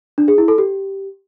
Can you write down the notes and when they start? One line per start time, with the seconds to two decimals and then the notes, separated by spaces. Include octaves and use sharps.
0.18 D4
0.28 G#4
0.38 E4
0.48 A4
0.58 G4